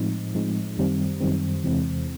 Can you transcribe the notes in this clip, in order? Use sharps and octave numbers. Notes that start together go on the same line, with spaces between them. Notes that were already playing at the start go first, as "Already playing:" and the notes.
Already playing: A2 F3 G#3 C4 D#4
A2 F3 G#3 C4 D#4
F#2 D#3 G3 C4
F#2 D#3 G3 C4
E2 C3 E3 G#3 C4